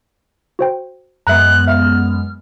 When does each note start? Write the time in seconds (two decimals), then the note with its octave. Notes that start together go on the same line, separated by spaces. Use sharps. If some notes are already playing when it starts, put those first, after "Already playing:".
0.59 F#4 C5 G5
1.27 F#2 G#3 B3 E5 A#5 F#6
1.67 E5 F5 F6